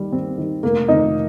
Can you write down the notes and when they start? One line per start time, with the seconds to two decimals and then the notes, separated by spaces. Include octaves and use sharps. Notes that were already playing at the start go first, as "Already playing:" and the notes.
Already playing: D#2 D#3 G3
0.12 D#2 C4
0.38 D#3 G3
0.63 F1 A#3
0.88 F2 C3 D#3 D#4